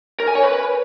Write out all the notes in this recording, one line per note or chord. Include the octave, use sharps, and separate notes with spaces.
A#4
G#5
C#5
B4